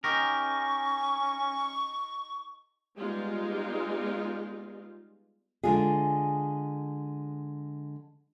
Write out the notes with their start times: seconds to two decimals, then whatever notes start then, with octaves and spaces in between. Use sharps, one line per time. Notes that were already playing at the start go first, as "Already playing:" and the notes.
0.04 C#4 D#4 G4 A#4 C#6
2.97 G3 G#3 B3 D#4 F4 G#4
5.63 D3 G#3 F4 G#4